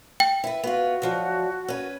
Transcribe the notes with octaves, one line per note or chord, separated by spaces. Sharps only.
G5
E4 B4
B3 F4 F#4
D2 F3 F#3
C#4 B4